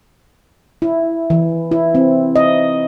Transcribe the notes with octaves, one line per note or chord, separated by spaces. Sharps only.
E4
E3
E4
C4
D#5